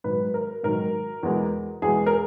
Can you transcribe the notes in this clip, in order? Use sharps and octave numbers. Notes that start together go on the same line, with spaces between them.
G#2 D#3 F#3 B4
A#4
G#2 D#3 F#3 A#4
E2 B2 G#3
E2 B2 G#3 G#4
A#4